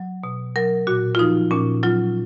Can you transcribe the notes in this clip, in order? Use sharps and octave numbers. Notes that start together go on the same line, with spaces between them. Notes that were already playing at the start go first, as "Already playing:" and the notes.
Already playing: F#3
B2
F#3 A#4
A#2 F#4
F4
F3 D#4
A#2 C#4
F#3 F4